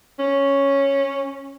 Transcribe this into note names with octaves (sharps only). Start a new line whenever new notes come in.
C#4